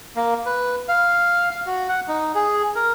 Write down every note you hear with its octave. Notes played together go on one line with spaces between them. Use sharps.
A#3
B4
F5
F5
F#4
F#5
D#4
G#4
A#4